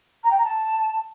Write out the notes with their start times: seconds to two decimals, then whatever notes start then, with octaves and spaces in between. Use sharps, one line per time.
0.24 A#5
0.30 G5
0.37 A#5
0.44 A5